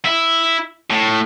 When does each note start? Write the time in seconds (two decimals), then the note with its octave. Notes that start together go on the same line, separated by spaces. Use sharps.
0.05 E4
0.90 A2